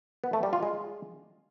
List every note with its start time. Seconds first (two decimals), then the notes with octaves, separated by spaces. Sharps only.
0.24 B3
0.33 A3
0.43 G3
0.53 F4
0.63 G#3